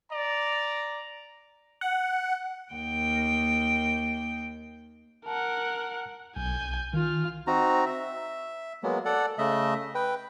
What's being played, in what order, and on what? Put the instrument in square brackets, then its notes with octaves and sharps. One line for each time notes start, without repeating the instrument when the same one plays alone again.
[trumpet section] D5 A#5
[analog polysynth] F#5
[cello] D#2 G5
[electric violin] A#4 F#5 [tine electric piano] A5
[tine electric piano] B1 [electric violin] G#5 G6
[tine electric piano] D#3 [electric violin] F4 F6
[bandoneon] C4 D#4 F#4 A#5
E5
F#3 G#3 A#3 B3
A4 D5 F#5
C#3 A3 D#5 E5
B4 G5